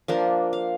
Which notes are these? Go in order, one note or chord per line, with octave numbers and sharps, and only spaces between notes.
F3 A#3 D4 A#4
F5